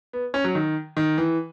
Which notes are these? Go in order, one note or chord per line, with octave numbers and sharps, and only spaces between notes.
B3
C#4
F#3
D#3
D#3
E3